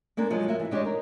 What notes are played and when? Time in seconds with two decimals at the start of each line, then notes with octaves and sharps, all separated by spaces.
0.17 G#3 A#3 B3 D4 A#4
0.30 C3 F3 F#3 G#3
0.48 A#3 B3 F#4 E5
0.60 E3
0.71 G#3 D4 G4 A4 C#5 D#5
0.85 D#4 A#4